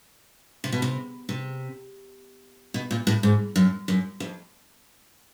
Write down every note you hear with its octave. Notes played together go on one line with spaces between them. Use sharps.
C3
B2
C3
C3
B2
A#2
A2
G#2
F#2
F#2
F2